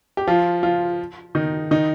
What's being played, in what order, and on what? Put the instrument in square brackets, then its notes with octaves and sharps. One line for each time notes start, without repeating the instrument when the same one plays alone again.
[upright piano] G4
F3 F4
F3 F4
D#3 D#4
D#3 D#4